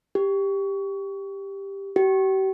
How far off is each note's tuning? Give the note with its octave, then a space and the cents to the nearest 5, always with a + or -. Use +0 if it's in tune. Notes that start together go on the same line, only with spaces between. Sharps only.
G4 +10
G4 -40